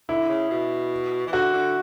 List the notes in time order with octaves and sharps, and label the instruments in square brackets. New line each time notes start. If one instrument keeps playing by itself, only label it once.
[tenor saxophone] D3 [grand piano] E4
[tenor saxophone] C#3
B2
E3
[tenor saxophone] D3 [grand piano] F#4
[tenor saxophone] D3